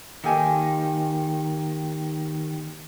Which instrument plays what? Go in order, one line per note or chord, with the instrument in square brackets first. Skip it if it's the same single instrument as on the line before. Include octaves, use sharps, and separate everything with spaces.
[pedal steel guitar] D#3 [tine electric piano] A#3 G4 G5 [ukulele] D#4 A4 G#5